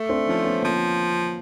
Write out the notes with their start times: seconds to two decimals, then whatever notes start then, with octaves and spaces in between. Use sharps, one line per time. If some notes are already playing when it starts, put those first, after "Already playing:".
Already playing: A3
0.09 C4 D4
0.27 F3 C#4 D#4
0.44 B3 C#4
0.62 F3 A#3 C4